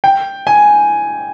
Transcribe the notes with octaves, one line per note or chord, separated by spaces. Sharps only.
G5
G#5